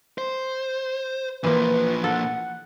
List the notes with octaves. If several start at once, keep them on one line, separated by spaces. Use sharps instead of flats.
C5
A#2 E3 F3 A#3 B4
A4 F#5